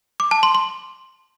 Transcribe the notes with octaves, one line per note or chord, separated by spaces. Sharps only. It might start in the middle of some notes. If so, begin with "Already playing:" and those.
D6
A5
C6
C6